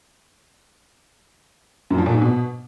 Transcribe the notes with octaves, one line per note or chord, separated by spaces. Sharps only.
F#2
F3
A#2
G#2
B2